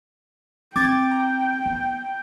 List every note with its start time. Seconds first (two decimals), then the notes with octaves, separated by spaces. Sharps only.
0.76 C4 G5 D6 G#6 A6
1.11 A#5
1.66 B3